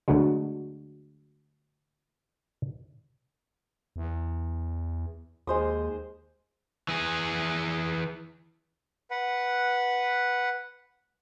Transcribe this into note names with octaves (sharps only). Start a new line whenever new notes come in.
D2 D3 F#3 G#3
E2
D#2 G#3 C5 D#6
E3 G#4
B4 F#5